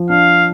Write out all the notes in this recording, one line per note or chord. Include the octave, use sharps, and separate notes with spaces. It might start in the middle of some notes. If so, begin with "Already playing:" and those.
Already playing: F3
D4 F5